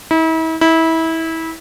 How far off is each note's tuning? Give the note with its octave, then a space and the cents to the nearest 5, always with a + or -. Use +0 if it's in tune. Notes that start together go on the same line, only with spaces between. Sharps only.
E4 -40
E4 -25